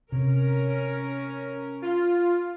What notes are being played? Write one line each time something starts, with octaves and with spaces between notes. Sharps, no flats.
C3 C#4 A#4
F4